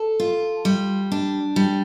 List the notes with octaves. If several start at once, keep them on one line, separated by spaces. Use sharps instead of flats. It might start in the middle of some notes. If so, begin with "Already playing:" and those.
Already playing: A4
F4
G3
D4
G3